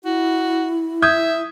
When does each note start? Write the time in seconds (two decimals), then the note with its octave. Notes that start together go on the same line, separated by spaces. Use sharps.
0.05 E4 F#4
1.02 E5 D#6 G6 G#6